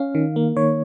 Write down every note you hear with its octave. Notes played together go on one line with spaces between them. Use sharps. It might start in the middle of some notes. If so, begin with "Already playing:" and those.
Already playing: C#4 F5
D#3
A#3
D#3 C#5